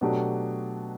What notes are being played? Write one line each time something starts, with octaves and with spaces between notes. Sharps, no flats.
B2 F#3 A3 D4 G4